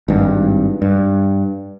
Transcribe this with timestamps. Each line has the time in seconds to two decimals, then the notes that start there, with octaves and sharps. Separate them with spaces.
0.08 G#1 G2
0.82 G2